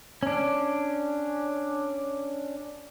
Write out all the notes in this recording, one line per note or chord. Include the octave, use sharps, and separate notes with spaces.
C#4 D4